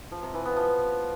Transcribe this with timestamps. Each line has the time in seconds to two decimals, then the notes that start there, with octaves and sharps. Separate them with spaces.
0.12 F3
0.23 C3
0.34 E3
0.45 B3
0.56 F3